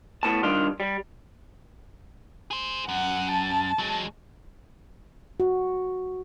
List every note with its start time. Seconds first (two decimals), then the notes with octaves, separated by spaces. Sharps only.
0.23 A2 B3 A5
0.43 G2 C3 D#3 D4 F4
0.80 G3
2.51 G#4 C5
2.89 F#2 F#5
3.32 A5
3.79 F#3 G#3
5.40 F#4